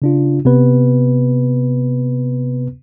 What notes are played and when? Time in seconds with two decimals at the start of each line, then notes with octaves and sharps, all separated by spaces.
0.02 C#3 D4 F4
0.45 C3 B3 B4